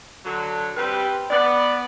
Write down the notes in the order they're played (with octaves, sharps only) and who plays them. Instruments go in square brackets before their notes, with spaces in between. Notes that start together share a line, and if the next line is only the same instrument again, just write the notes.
[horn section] D3 F#3
G3 C4 G4 B4
B3 D5